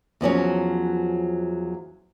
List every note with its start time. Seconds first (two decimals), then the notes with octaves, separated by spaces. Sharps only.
0.21 E2 F3 F#3 C#4